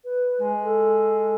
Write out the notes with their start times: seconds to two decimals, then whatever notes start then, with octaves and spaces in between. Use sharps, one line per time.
0.05 B4
0.38 G#3
0.63 A4